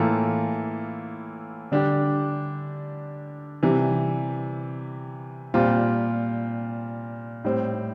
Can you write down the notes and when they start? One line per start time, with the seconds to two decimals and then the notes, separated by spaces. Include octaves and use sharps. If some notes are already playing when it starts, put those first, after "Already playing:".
Already playing: A2 E3 A#3 F4 A4
1.72 D3 G3 D4 G4
3.63 C3 E3 G3
5.54 A#2 G3 C4 F4
7.44 A2 G3 C4